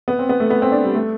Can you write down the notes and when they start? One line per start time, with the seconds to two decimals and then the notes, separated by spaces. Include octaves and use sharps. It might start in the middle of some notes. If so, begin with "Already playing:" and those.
0.08 B3
0.19 C4
0.29 B3
0.40 A3
0.50 B3
0.62 C4
0.72 D4
0.84 G3
0.94 A3